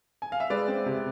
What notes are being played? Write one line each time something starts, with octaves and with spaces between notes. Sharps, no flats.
G#5
F5
E5
G#3 B4 D5
C4
C3